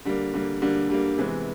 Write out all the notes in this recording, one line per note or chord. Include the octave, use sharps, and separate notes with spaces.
D3 G3 A#3
D3 G3 A#3
D3 G3 A#3
D3 G3 A#3
C3 E3 G#3 B3